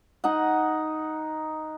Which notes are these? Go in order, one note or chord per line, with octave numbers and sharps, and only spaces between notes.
D#4 D#5 F#5